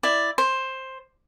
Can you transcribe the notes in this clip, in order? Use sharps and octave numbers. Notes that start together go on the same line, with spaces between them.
E4 D5
C5